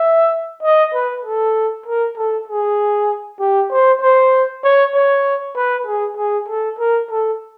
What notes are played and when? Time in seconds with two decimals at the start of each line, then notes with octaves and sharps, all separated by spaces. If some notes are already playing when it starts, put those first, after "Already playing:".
Already playing: E5
0.63 D#5
0.94 B4
1.25 A4
1.86 A#4
2.17 A4
2.47 G#4
3.40 G4
3.70 C5
4.01 C5
4.63 C#5
4.95 C#5
5.56 B4
5.86 G#4
6.17 G#4
6.48 A4
6.79 A#4
7.10 A4